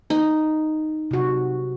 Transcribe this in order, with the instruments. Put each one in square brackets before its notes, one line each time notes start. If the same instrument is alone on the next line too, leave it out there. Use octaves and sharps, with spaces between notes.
[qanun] D#4
[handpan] C3 F#4